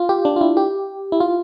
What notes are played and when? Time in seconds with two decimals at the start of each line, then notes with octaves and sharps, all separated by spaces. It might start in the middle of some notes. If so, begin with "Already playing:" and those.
Already playing: F4
0.09 G4
0.25 D4
0.36 F4
0.41 E4
0.57 G4
1.12 E4
1.20 F4